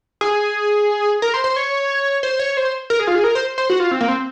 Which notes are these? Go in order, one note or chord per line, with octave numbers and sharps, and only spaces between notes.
G#4
A#4
C5
C5
C#5
C5
C#5
C5
A#4
G#4
F4
G#4
A#4
C5
C5
F#4
F4
C4
A#3
C4